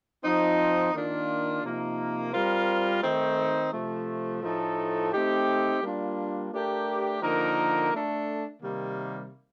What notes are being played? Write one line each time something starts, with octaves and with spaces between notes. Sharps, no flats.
F3 C4 D#4
D#3 A#3 D4 F4
C3 F3 A#3 D#4
G3 C4 F4 A#4
D#3 A3 C4 D#4
C3 F3 A3
A2 F3 A3 D#4 A4
A3 C4 D#4 G4
G3 A#3 D4 F4
A3 D4 G4 A#4
D3 F3 A#3 D#4 A#4
A3 D4 A4
C3 D#3 G3 A#3